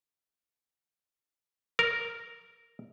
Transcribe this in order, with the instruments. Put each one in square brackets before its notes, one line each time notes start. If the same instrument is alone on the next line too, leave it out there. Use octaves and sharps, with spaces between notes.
[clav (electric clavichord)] A#4